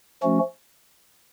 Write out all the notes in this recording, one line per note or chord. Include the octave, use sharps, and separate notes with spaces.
F3 A3 C#4 F#4